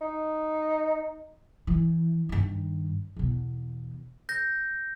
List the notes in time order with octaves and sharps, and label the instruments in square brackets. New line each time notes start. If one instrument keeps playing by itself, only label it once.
[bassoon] D#4
[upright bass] E3
G2 D#3
E2 B2
[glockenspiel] G6 A#6